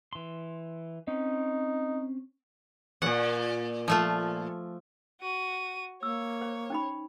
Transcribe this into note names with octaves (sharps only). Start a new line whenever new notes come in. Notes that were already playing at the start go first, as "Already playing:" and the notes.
E3 C6
C4 C#4 D#4
E2 A#2 F#5
F3 A3 F4
F#4 D#7
A#3 C#5 E6
C5
C#4 D#4 B5